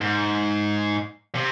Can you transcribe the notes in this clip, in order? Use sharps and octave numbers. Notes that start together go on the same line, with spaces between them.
G#2
C3